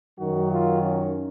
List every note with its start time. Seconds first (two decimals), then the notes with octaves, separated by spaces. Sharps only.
0.19 F#2 D#3 F#3 F#4
0.51 F4
0.81 C#4